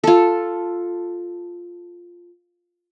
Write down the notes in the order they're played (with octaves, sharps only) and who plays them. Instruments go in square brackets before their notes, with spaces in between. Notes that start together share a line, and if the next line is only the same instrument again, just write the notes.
[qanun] F4 A4